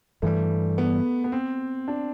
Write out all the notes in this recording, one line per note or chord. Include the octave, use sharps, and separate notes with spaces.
G2 E3 G3 A3
B3
B3
C4
D4